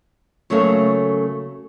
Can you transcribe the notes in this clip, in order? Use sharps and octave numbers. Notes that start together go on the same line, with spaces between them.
C#3 F#3 A3 A#3 A4 F5